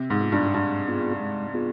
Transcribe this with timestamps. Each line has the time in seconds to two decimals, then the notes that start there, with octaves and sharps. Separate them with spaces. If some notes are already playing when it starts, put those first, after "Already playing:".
Already playing: C3
0.10 G#2
0.21 B3 F4 G#4
0.32 G2
0.54 G2 G#3
0.88 B3 F4 G#4
1.20 G#3
1.54 B3 F4 G#4